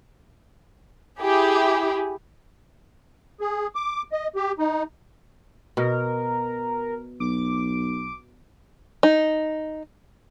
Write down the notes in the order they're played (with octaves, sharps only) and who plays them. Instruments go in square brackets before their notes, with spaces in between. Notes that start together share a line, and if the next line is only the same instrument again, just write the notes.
[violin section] E4 G4 G#4
[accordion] G#4
D6
D#5
G4
D#4
[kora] B2 [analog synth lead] A#4
[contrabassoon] B1 [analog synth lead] D6
[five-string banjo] D#4